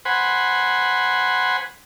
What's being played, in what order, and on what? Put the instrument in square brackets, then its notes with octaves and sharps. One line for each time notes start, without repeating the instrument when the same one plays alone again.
[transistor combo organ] C5 F#5 G#5 B5